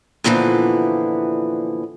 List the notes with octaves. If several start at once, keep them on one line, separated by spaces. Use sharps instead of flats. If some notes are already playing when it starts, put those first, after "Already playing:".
A#2 D3 E3 F3 B3